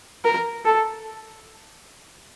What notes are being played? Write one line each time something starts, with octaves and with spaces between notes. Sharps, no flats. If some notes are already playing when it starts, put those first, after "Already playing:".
A#4
A4